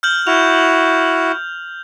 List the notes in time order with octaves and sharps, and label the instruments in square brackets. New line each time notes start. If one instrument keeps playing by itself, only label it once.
[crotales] F6 G6 F#7
[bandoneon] E4 F#4 [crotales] F7